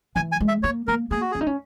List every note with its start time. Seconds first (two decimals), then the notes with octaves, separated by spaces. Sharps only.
0.16 E3 G#5
0.32 G#5
0.40 G#3
0.48 E5
0.63 A#3 C#5
0.87 A#3 A#4
1.11 A#3 G#4
1.21 F#4
1.32 C#4 G#4
1.41 D#4
1.47 C#4